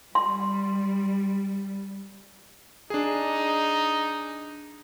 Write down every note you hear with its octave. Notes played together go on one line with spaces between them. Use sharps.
G3 C6
D4 D#4 G#4